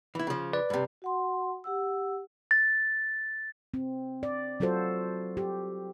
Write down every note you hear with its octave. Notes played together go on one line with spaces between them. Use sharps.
E3 E4
C#3 F3
B4 D5
G2 C3
F#4 F#5 C6
G4 F#5 E6
A6
C4
D5
F#3 F4 F#4 A4 C5
G4